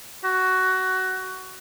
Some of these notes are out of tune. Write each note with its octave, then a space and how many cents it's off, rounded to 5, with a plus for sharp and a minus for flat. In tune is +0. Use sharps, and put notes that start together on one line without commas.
F#4 +15